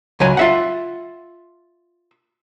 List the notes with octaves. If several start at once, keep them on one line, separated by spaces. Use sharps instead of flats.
C#2 F#3 G#5
F4 E5 F#5